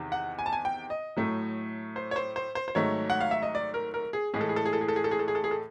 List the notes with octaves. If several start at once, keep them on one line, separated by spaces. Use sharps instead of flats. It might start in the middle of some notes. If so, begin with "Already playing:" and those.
Already playing: E2 C3 D#3
F#5
G#5
A5
G#5
G5
D#5
A2 F#3 A3
C5
C#5
C5
C5
C5
C5
G#2 D#3 F#3 A3 C#5
F#5
F5
E5
D#5
D5
A#4
A#4
G#4
A2 E3 G#3 G#4
A4
G#4
A4
G#4
A4
G#4
A4
G#4
A4
G#4
A4
G#4
A4
G#4
A4